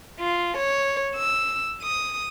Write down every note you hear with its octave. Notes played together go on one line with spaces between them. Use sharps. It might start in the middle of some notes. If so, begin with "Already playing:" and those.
F4
C#5
E6
D#6